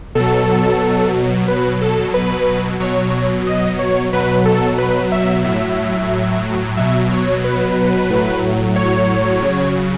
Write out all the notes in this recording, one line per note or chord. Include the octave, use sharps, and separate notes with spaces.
B2 F#3 A4
B2 F#3 B4
A4
B4
B2 F#3 C#5
D#5
C#5
B2 F#3 B4
A4
B4
E5
A2 F#3 E5
B2 F#3 E5
C#5
B4
A2 F#3
C#5
C#3 F#3